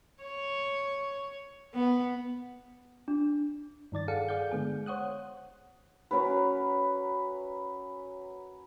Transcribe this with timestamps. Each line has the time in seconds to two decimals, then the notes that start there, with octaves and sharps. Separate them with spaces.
0.23 C#5
1.74 B3
3.08 D4
3.92 G2 D#3 D5 A6
4.08 G#4 A4 F5 F#5 C#7
4.29 G#4 D5 F5 G6
4.51 D3 G#3 B3 G#4
4.86 C5 C#5 F#5 D#6 F#6
6.11 F#3 C#4 A#4 B4